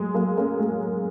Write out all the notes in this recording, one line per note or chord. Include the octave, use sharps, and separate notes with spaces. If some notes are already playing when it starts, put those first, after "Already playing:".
Already playing: F#3 G#3
F#3 A#3
A#3 C#4
G#3